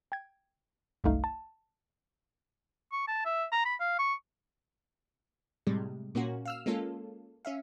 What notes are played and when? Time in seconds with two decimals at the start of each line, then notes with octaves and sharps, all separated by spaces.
0.12 G5 G#6
1.04 G1 C2 F#2 A3 D#4 F5
1.24 A5
2.92 C#6
3.07 A5
3.25 E5
3.52 A#5
3.65 B5
3.80 F5
3.99 C#6
5.67 A2 C3 G3 G#3
6.15 A#2 A#3 C#4 F#4
6.45 F5 E6 F6
6.66 G#3 A#3 C#4 F4 A4
7.45 C#4 E5 F5